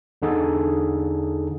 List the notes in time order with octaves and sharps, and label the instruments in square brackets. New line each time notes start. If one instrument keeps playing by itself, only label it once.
[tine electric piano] E2 D3 D#4 G#4 A4